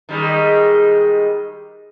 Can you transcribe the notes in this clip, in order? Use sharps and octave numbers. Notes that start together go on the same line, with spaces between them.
D#3 G3 G#3